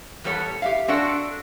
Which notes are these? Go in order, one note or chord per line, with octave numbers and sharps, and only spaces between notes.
E2 G3 A4 C#5 F#5
G4 E5 F5
C4 D4 F#4 A4 F#5